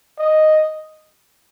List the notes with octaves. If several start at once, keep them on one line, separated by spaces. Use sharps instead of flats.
D#5